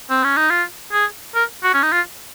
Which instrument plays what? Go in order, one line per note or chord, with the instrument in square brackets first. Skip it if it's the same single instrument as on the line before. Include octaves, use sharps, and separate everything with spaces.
[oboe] C4
C#4
D#4
F4
G#4
A#4
F#4
C#4
D#4
F4